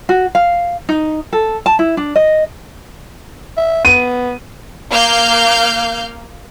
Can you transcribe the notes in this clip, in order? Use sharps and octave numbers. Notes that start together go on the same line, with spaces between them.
F#4
F5
D#4
A4
A5
E4
D4
D#5
E5
B3 D#7
A#3 F5 F6 G6